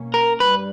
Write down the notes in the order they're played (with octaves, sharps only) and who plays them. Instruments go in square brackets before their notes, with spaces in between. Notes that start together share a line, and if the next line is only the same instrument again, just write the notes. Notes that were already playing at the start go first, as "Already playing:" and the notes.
Already playing: [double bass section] B2 A#3 C#4
[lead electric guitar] A#4
[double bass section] G2 G3 [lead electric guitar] B4